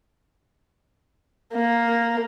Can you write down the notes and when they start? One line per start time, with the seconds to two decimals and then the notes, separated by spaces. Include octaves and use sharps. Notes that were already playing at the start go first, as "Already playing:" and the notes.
1.53 A#3